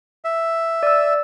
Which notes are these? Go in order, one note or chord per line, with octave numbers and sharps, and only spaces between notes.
E5
D5 E6